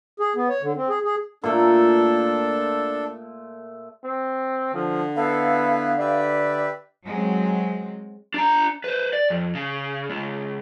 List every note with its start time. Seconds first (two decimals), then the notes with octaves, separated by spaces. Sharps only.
0.20 G#4
0.36 B3
0.49 C#5
0.62 D3
0.76 C4
0.89 G#4
1.05 G#4
1.44 A#2 A3 D4 A4
4.04 C4
4.74 D3 F3
5.16 B3 E4 A4 B4 F5
5.99 G4 B4 D5 E5
7.05 F#3 G#3 C4
8.34 D4 A#5
8.84 B4 C5
9.13 D5
9.30 F2
9.55 C#3
10.10 C#2